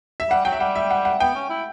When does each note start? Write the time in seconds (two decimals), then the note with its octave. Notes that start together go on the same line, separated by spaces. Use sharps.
0.20 E5
0.30 G3 F#5
0.45 F#3 G5
0.52 E5
0.60 G3 F#5
0.75 E5
0.91 F#5
1.05 F#5
1.20 B3 G5
1.36 C#4
1.50 E4